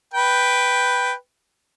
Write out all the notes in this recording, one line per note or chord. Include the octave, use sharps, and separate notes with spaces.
B4 G5